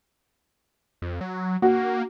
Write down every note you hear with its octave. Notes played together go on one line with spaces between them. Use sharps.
F2
F#3
A#3 F#4